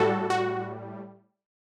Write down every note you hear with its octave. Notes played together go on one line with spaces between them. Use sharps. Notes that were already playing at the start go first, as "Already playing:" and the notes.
Already playing: A2 G3 F#4 A4
F#4